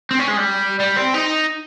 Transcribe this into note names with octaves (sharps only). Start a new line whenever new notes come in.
C4
C#4
G#3
G3
G3
C4
D#4